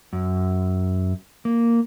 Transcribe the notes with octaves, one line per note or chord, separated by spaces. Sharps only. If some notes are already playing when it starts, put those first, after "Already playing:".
F#2
A#3